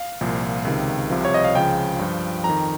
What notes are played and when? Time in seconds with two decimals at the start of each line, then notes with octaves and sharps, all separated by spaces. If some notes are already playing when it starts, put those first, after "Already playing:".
Already playing: F5
0.21 C2 A#2 F3
0.65 C#2 C3 D#3
1.10 C2 C3 F3
1.25 C#5
1.34 D#5
1.44 F5
1.55 C#2 C#3 F3 G5
1.99 G2 F3
2.44 F2 D#3 A#5